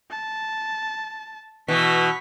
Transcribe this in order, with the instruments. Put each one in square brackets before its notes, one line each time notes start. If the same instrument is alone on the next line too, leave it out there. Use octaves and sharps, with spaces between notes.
[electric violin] A5
[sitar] B2 E3 [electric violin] C#6 B6